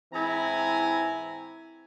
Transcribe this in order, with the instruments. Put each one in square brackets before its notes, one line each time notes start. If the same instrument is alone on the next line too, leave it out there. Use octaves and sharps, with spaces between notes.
[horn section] G#2 E3 C4 E4 G#5 A#5